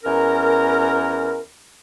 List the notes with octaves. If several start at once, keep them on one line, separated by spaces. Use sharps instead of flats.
E2 C#4 A#4